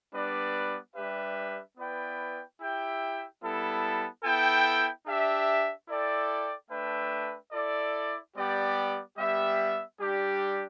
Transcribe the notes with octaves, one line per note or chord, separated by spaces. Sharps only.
G3 B3 D4 B4 D5
G3 D4 G4 B4 E5
B3 E4 B4 D5 G5
E4 G4 E5 G5
G3 B3 E4 A4
B3 E4 A4 G5
D4 G4 E5
E4 A4 D5 G5
A3 D4 B4 E5 G5
E4 A4 D5
G3 B3 G4 D5 G5
G3 B3 G4 E5
G3 D4 G4